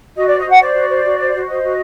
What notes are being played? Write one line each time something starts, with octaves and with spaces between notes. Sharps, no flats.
F#4 D#5
C5 D5
D#5
F#4 F#5
C5 D5
F#4
C5
F#4
C5
F#4
C5 D#5
F#4